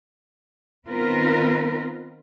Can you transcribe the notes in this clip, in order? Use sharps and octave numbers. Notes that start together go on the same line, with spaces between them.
D#3 B3 C4 F4 A#4 B4